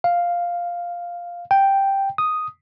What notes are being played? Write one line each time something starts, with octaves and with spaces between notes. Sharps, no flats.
F5
G5
D#6